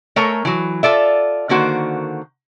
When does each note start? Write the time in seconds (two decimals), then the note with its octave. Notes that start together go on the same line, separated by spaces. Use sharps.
0.16 A3 A4 A#4 C#5 G#5 A#5
0.45 E3 F#3
0.83 F4 A4 D5 E5
1.49 D3 D#3 A#3 F#4 C5